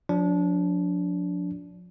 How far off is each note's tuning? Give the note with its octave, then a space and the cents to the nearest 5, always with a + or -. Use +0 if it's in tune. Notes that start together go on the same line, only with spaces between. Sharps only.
F3 +40 D4 -20